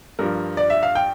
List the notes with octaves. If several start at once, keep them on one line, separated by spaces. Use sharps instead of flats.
G2 F3 A#4
D5
E5
F5
G5